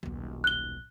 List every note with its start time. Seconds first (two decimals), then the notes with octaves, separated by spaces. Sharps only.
0.03 D#1 B1
0.44 F#6 G7